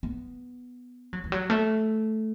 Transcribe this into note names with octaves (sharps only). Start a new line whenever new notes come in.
B3
F#3
E3
F#3
A3